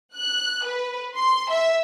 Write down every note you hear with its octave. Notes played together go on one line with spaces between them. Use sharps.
F#6
B4
C6
E5